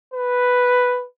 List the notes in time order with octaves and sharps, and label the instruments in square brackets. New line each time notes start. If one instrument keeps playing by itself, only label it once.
[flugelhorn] B4